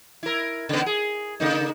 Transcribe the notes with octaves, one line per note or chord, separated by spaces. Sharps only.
E4 A#4
C#3 B3
G#4
C#3 A#3 D#4